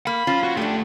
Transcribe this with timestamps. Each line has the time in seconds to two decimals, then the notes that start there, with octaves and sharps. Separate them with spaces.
0.07 A#3 B5
0.27 F3 C#4 F4
0.43 F#4
0.57 D3 A3 D4 G4